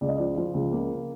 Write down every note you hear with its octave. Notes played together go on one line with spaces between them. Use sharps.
C#2 D5
D#5
F3 D5
F3
C#2
A#3